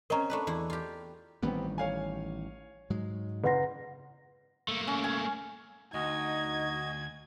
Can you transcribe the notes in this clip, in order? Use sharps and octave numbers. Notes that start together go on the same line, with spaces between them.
C4 C#4 A#4 D#5 A#5
A3 D4 B4
E2 E4
F4 G4
A1 D#3 G3 B3 C4
C#5 F5 G#5
G#2 F#3 G#3
F#1 B4 F#5 C6 A#6
A3 A#3
C#4
G#5
D2 D#4 F#4 D#5 G#6